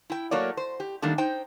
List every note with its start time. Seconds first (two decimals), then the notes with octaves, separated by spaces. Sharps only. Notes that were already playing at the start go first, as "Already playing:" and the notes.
0.10 E4 G5
0.31 F#3 A3 A#3 A#4 C#5 D5
0.57 C5
0.80 G4
1.02 D#3 F#3 G3 A3 A#3 D4
1.18 D#4 C5 G5